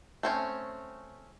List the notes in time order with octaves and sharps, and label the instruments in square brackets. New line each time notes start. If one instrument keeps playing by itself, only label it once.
[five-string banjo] A3 C4 C#4